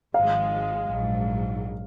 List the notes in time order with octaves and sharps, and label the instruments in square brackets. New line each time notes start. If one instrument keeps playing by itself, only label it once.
[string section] G#1 G#2 F3 G#3 [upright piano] F5
[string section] A#1 G#2 F#3